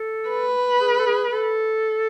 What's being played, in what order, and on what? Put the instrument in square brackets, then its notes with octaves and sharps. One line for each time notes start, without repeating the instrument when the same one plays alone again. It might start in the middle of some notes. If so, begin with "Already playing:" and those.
Already playing: [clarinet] A4
[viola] B4
[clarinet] G#4
A4
G#4
A4